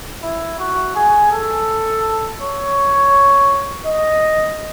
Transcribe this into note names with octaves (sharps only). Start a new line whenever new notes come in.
E4
F#4
G#4
A4
C#5
D#5